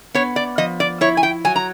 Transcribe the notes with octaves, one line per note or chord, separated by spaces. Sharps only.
B3 C#5
D5
F3 D#5
D5
E4 C#5
G#5
G5
F#3 G#5
A#5